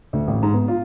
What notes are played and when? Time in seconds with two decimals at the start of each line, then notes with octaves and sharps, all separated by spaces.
0.13 D2
0.28 A1
0.43 G#2
0.54 B3
0.68 F4